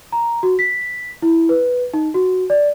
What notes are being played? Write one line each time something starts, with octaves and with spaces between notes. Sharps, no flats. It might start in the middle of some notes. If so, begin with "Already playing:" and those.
A#5
F#4
B6
E4
B4
D#4
F#4
D5